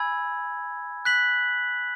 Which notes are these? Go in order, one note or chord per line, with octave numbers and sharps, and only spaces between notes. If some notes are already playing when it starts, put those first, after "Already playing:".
Already playing: G#5 B5 E6 G#6
F#6 B6 F#7